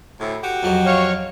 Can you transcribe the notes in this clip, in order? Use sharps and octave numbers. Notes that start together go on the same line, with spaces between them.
D2 A2
F#4 G4
F2 F#3
C#5 F5 C#6